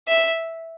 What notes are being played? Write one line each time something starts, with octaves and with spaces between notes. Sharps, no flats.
E5